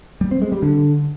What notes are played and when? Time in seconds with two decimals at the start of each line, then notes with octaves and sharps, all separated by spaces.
0.21 G3
0.31 C4
0.42 G#3
0.52 G3
0.62 D3